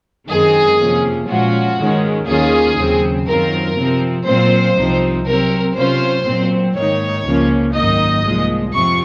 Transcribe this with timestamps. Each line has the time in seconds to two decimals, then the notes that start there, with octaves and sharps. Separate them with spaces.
0.28 F#2 D#3 G#3 C4 G#4
0.78 F2 C3 F3 A#3 C#4
1.28 A#2 F3 G#3 C#4 F4 F#4
1.78 G#2 D#3 G#3 C#4
2.27 D#2 D#3 A#3 C#4 F4 G#4
2.78 D#2 C#3 F#3 C4
3.27 F#2 D#3 F#3 C4 F4 A#4
3.76 C3 F3 C4
4.26 A#2 F#3 C4 F4 C5
4.76 C2 C3 F3 C4 D#4
5.25 C3 F#3 C4 A#4
5.75 C3 F#3 C#4 F4 C5
6.25 A#2 F#3 C4
6.75 G#2 D#3 A#3 D#4 C#5
7.25 C#2 C#3 F3 A#3 C#4
7.74 G#1 F#2 D#3 A#3 D#4 D#5
8.24 C2 A#2 F3 G#3
8.73 F2 C3 F3 C#6